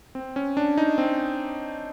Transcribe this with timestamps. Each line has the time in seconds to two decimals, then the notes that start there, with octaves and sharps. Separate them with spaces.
0.15 C4
0.36 C#4
0.57 D4
0.78 D#4
0.98 C4